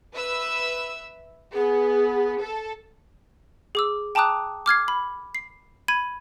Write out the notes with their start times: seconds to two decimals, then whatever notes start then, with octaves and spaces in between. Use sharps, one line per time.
0.14 B4 E5 E6
1.53 B3 G#4
2.40 A4
3.75 G#4 D6 E6
4.15 G5 A5 A#5 D6 D#6 F#6
4.66 D6 F6 G#6 C7
4.88 B5
5.35 C7
5.88 B5 G#6 D#7